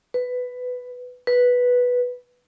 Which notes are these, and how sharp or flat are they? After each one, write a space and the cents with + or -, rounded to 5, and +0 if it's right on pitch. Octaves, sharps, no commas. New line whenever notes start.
B4 +10
B4 -5